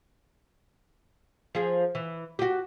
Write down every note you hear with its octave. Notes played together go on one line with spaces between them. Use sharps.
F3 G#4
E3
F#4 G4